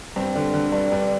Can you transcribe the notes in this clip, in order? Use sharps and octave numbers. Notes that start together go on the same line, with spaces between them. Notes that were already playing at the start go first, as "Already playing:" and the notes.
G2 C4
D3
D3
G2 D4
G2 D4